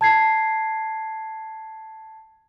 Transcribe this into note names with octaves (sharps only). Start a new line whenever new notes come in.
A5 G#6 C7